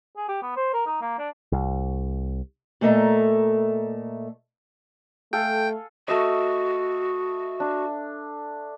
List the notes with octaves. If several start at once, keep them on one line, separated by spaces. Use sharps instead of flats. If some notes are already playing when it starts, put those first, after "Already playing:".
G#4
G4
B3
C5
A#4
D#4
A#3
D4
C2
A#2 A3 A4 D#5 E5 A#5
A3 A4 F5 G5 G#5
A3 F#4 D#5
D4